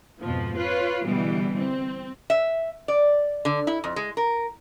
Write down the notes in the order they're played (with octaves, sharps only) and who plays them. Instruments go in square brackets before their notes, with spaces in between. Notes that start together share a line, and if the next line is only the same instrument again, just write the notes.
[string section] F2 G#2 B2 F3
F4 B4 C#5
B2 D3 E3 G3 B3
C4
[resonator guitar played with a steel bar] E5
D5
D3
E4
F2
G#3
A#4